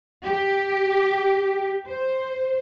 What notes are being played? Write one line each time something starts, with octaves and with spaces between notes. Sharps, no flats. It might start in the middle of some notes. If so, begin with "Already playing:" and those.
G4
C5